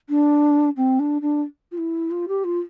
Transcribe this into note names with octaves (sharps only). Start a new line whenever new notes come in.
D4
C4
D4
D4
F4
E4
F4
G4
F4